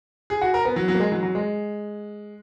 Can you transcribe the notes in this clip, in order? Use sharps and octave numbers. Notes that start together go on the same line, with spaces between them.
G#4
F#4
A#4
B3
F#3
F#3
A#3
G#3
F#3
F#3
G#3